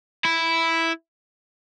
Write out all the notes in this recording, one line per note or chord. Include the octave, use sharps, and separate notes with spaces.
E4